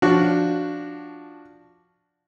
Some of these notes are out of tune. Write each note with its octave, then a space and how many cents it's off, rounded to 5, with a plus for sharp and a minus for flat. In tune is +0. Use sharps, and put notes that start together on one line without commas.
F3 +0 D4 +0 F#4 +0